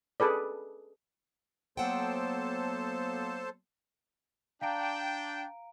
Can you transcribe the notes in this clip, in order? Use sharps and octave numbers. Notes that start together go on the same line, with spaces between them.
G#4 A4 B4 D5
F#3 A#3 B3 A4 C5 F#5 G5 A5
D4 F5 G5 A#5 D7